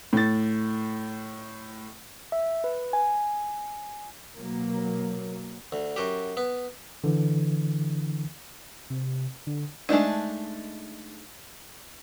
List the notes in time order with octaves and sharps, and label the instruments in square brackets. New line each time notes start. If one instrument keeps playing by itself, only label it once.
[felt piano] A2 A6
[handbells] E5
B4
G#5
[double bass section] B2 F#3 A#3
[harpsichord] D2
F#2 F#4 G4
B3
[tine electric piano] D3 E3
[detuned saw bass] C3
D3
[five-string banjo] G#3 A3 D4 D#4